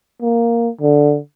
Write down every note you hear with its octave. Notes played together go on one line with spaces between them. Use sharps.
A#3
D3